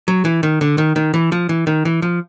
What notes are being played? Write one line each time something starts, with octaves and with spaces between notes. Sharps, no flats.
F#3
E3
D#3
D3
D#3
D#3
E3
F3
E3
D#3
E3
F3